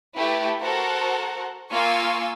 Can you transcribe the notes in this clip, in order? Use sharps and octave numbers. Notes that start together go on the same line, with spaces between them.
A3 E4 G4 B4
F#4 A4 A#4 C5 F#5
A#3 F4 F5 G#5 C#6 E6